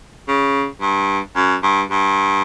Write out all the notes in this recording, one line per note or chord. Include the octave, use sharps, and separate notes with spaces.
C#3
G2
F#2
G2
G2